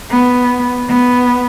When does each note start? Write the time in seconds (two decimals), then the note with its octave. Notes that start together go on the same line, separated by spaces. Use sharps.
0.11 B3
0.89 B3